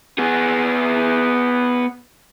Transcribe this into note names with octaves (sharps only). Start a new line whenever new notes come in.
B3 G#4